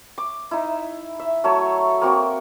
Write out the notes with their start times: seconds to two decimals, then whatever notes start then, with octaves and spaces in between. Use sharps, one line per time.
0.18 D6
0.51 D#4 E4
1.19 E5
1.44 F#3 A3 A4 C#5
2.01 A#3 C4 F#4